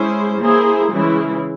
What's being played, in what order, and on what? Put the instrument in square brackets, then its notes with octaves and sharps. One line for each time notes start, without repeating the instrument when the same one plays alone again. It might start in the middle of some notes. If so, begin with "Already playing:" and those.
Already playing: [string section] G#3 C#4 E4 G#4 C5
A#3 E4 G#4 C5
C#3 E3 G#3 E4